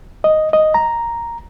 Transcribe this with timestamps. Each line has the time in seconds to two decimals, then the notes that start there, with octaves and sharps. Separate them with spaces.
0.24 D#5
0.53 D#5
0.74 A#5